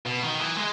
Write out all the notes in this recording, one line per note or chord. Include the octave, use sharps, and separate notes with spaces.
B2
D#3
E3
G#3